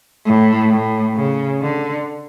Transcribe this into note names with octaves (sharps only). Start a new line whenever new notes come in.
A2
A2
C#3
D3